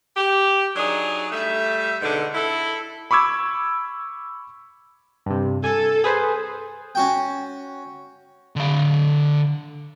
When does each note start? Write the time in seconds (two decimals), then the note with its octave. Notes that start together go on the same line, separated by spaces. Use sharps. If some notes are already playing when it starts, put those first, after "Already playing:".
0.16 G4
0.76 F#3 D4 D#4 G#4
1.32 G3 A3 E5
2.02 G#2 B2 D3
2.34 E4 A4
3.11 B5 C#6 D6 E6 G#6
5.26 G2 C3
5.64 A4 G#5
6.04 G#4 B4 C5
6.95 C#4 F#4 G5
8.56 D3 F5